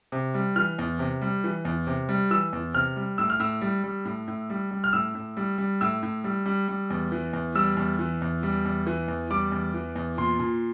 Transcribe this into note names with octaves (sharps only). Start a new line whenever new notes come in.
C3
G3
E3 F6
E2
C3
G3
E3
E2
C3
G3
E3 E6
E2
C3 F6
G3
A2 E6
F6
A2 E6
G3
G3
A2
A2
G3
G3
F6
A2 E6
A2
G3
G3
A2 E6
A2
G3
G3
G3
E2
E3
E2
G3 E6
E2
E3
E2
G3
E2
E3
E2
G3 D6
E2
E3
E2
A#2 C6
A#2